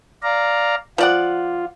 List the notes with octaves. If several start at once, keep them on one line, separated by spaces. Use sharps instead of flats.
D5 F5 A#5
F3 F4 D5 F#5